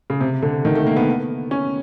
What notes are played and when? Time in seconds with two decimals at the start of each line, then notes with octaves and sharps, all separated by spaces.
0.10 C#3
0.21 C3
0.42 D3
0.65 D#3
0.75 A3
0.86 A#3
0.96 B3
1.51 C#4